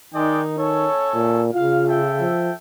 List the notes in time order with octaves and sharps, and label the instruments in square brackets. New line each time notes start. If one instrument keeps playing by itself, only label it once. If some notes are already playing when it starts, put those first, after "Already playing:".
[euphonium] D#3 [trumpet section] G#3 D5 G5 [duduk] D#4
[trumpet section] A3 C#4 A4 [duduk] C#5
[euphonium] A#2
[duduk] C#3 [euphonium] F4 [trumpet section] F5
[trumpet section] A4 E5 G5
[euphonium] F3